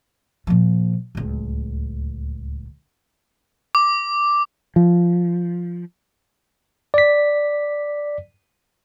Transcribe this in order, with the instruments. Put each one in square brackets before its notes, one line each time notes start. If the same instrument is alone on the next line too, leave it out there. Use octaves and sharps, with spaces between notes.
[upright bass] A#2 F3
D1 C#2
[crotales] D6
[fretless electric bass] F3
[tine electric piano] D5 B6